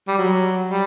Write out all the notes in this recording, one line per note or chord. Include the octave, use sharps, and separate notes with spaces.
G3
F#3
G3